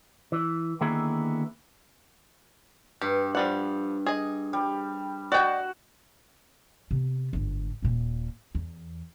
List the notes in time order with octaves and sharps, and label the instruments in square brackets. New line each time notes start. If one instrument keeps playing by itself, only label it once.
[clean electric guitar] E3
D3 D#3 A#3 B3 E4 G#4
[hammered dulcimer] G2 [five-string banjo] G4
[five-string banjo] F3 G3 F#5
G#4 D#5
[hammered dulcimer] G3
[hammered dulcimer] F#4 [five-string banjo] D5 D#5 G5
[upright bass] C3 B3
G1 G#2
D#1 A#2
E2